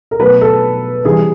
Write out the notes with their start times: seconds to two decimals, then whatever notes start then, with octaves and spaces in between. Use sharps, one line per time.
0.11 A#4
0.20 B2 F#3 A3 B4
0.41 A4
1.04 C3 E3 G3 G#4